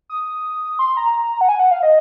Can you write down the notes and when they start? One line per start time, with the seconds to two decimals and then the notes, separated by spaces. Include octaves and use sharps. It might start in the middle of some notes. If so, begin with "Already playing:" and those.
0.10 D#6
0.79 C6
0.97 A#5
1.41 F#5
1.49 G#5
1.60 F#5
1.71 F5
1.83 D#5